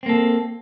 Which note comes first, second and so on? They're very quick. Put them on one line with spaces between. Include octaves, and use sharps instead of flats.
C4 A#3 A4